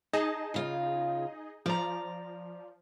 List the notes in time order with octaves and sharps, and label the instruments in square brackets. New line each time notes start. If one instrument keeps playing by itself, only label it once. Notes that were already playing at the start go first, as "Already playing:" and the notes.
[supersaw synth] D#4 G#4 D#5 [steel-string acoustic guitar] A5
[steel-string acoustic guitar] C#3 F4
[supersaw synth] F3 [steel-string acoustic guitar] D5 A#5